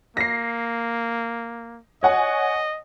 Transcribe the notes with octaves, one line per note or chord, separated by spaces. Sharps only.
A#3 A#6 C7
C#5 D#5 F#5 G#5